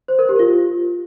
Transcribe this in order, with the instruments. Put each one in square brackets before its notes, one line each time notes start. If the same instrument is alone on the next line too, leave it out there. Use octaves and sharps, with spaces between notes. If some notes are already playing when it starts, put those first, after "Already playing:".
[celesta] C5
A#4
G4
F4